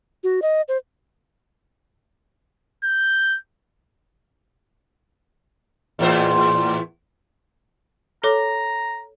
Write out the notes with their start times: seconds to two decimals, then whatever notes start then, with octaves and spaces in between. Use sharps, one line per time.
0.24 F#4
0.42 D#5
0.68 C5
2.84 G6
5.99 E2 A2 C5
8.24 A4 C#5 A#5 D6